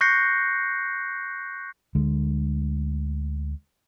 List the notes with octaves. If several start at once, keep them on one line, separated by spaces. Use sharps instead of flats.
C#6 F#6 G6 A#6 C7 C#7
D2 D3 G#3